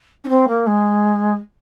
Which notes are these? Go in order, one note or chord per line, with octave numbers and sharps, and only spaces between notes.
C#4
C4
A#3
G#3